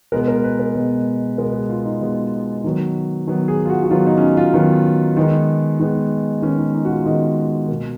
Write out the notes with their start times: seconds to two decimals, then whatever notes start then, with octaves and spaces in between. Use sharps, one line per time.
0.12 B2 G#3 B3 A#4
0.28 A#4
0.44 B4
0.60 A#4
0.75 B2 G#3 B3
1.38 B2 G#3 B3 A#4
1.54 G#4
1.69 F4
1.85 D#4
2.01 B2 G#3 B3
2.64 D#3 F#3 B3
3.27 D#3 F#3 B3
3.48 G#4
3.65 F4
3.69 F#4
3.84 F#4
3.90 D#3 F#3 B3 F4
4.07 D#4
4.18 C#4
4.22 D#4
4.37 F4
4.54 D#3 F#3 B3
5.16 D#3 G#3 B3 D#4
5.80 D#3 G#3 B3
6.42 D#3 G#3 B3 C#4
6.58 D#4
6.74 D#4
6.85 F#4
6.90 F4
7.06 D#3 G#3 B3 D#5
7.68 B2 A#3